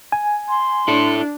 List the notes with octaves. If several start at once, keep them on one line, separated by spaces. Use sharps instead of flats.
G#5
C6
D4 E4 A4